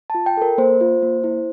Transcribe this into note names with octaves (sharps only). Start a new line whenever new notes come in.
F4 A5
G5
A4 A#4
A#3 C5
F4
A#3
E4